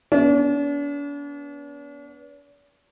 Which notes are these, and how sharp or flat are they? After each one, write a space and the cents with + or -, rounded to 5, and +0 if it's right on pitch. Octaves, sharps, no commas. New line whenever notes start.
B3 -15 D4 -45